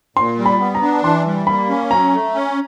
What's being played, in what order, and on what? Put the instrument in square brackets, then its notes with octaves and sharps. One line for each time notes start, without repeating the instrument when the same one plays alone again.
[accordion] A#2 [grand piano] C6
[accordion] G3
[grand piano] B5
[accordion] B3
[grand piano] A#5
[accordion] D4
[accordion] E3 [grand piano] C6
[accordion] G3
[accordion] A#3 [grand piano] B5
[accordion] C#4
[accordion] F#3 [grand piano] A#5
[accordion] A3
C#4